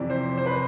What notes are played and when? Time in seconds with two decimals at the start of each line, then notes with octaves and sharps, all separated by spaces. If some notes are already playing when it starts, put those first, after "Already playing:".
Already playing: F2 C3 E3 D5
0.10 C5
0.37 C5
0.46 B4